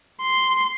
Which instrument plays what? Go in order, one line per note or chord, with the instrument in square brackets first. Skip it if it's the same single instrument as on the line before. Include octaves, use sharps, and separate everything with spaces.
[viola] C6